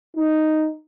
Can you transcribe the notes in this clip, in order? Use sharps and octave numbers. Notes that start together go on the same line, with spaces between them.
D#4